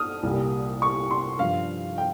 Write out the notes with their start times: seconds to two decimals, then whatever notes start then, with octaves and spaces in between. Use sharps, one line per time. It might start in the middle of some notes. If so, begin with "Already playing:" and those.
Already playing: D#6 F6
0.23 C2 A#2 G3
0.82 C#6
1.11 C6
1.39 G2 F3 F5
1.98 G5